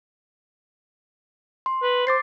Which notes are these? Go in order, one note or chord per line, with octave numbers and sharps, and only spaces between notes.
C6
B4
C5 D6 A6 C7